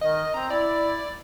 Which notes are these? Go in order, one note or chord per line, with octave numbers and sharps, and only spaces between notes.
D#3 D#5
C4 A#5
E4 D5